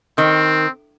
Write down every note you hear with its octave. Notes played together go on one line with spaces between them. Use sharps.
D#3 C4